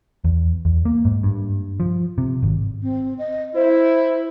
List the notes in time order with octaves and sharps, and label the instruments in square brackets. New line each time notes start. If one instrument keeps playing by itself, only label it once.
[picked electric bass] E2
E2
A#3
G#2
G2
F3
C3
G#1
[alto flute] C4
D#5
[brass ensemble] E4 [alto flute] C5